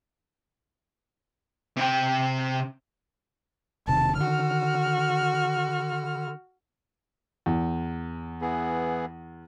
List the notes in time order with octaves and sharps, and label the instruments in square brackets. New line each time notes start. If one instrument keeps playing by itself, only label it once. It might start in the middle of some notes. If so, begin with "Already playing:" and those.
[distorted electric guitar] C3 G5
[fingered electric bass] E1 C3 D#3 [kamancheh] A5
[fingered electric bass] D3 D#3 [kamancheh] F#4 F6
[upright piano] E2
[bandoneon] E3 B3 G#4